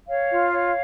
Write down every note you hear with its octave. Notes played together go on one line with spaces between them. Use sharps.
C#5 F5
F4
C#5